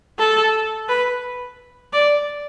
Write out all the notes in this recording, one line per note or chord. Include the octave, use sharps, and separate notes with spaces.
A4
B4
D5